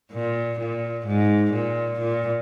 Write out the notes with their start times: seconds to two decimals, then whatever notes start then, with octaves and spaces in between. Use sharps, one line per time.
0.12 A#2
0.60 A#2
1.07 G#2
1.53 A#2
2.00 A#2